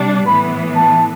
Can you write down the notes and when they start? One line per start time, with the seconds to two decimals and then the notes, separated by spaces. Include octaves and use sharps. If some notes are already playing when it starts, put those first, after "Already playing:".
Already playing: C3 G3 D4
0.27 A2 E3 B3 B5
0.76 A5